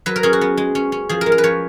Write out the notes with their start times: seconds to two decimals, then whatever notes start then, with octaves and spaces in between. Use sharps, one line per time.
0.06 F#3 B4
0.16 A#4
0.23 C#4 G#4
0.33 F#4
0.41 B3
0.57 G#3
0.75 C#4
0.92 C#4
1.09 F3 G#4
1.21 G#3 A#4
1.32 A#4
1.38 B4
1.44 F3 C#5